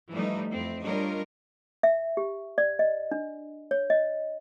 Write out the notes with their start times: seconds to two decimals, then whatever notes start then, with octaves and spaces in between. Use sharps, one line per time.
0.11 E3 F3 G3 A3 D#4
0.50 F2 C4 E4
0.84 G3 D4 F4 A#4 C#5 D#5
1.83 E5
2.17 G4
2.58 D5
2.79 D#5
3.11 D4
3.71 C#5
3.90 D#5